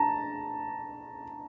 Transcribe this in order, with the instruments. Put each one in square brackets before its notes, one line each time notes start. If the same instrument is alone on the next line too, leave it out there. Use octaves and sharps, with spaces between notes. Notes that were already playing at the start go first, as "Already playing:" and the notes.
Already playing: [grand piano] A5 A#5